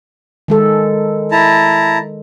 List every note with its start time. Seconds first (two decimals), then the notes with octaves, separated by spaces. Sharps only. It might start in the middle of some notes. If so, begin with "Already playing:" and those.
0.48 D#3 G#3 A4
1.32 E4 A5 A#5